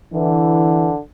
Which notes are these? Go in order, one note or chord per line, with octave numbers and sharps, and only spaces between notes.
D3 E3